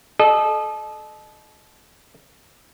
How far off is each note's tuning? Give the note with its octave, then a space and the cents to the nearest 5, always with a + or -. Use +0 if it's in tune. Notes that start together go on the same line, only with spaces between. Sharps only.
A4 -30 D#5 -30